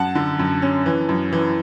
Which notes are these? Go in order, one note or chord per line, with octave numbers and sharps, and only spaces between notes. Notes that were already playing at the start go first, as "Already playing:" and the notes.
Already playing: F#2 F#5 A5
D3
F#2
C#4
E3
F#2
E3